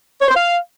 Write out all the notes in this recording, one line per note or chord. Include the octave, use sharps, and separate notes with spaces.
C#5
C5
F5